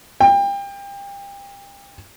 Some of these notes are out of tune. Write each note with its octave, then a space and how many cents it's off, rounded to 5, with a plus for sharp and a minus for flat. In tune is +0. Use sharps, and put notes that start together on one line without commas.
G5 +30